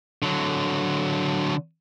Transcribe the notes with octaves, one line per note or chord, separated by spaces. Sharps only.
D3 F#3